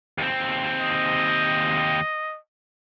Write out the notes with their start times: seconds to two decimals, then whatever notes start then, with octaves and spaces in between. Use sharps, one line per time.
0.18 D#2 C4
0.80 D#5